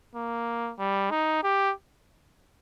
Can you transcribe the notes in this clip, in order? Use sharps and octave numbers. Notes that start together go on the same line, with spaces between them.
A#3
G3
D#4
G4